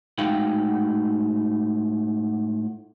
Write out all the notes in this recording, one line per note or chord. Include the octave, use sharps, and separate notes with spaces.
A2 G#3 D#4 F#4 F5 G5